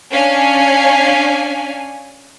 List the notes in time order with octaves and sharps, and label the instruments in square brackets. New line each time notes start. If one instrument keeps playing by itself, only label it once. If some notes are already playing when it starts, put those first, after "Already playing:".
[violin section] C#4 D4 F5 G#5